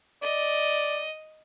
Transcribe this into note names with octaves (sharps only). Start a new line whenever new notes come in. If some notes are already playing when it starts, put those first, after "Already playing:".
D5 D#5